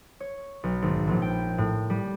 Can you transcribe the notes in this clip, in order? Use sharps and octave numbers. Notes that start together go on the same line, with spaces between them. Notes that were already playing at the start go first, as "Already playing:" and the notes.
C#5
B1
G#1
A#1
G5
A2
G3